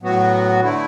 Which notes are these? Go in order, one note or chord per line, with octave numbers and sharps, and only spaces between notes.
A2 F#3 B3 F#4
D3 A3 E4